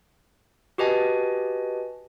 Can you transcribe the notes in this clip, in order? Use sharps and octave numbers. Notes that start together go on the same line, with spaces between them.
F#4 G4 B4 D#5 G#5 A5